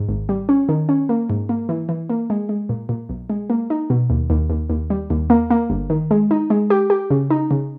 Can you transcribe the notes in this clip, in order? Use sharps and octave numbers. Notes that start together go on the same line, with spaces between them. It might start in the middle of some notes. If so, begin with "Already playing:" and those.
Already playing: G#2
G#1
G3
C#4
D#3
C#4
A#3
G#2
A#3
E3
E3
A#3
G#3
G#3
A#2
A#2
B1
G#3
A#3
D#4
B2
D#2
D#2
D#2
D#2
G3
D#2
A#3
A#3
G1
D#3
G#3
D#4
G#3
G4
G4
C#3
D#4
C#3